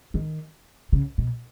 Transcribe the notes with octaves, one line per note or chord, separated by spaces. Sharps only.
D#3
C#3
B2